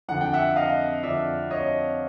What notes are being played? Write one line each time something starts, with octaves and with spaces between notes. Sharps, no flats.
F2 D3 F#5
G5
E5 F#5
D#5 F5
F2 D3 D5 E5
C#5 D#5